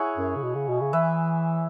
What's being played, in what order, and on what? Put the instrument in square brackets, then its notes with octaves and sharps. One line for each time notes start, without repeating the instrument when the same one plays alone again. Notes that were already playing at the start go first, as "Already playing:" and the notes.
Already playing: [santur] E4 G#4 C#5 F#5
[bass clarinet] F#2
C#3
B2
C#3
B2
C#3
[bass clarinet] E3 [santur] B4 E5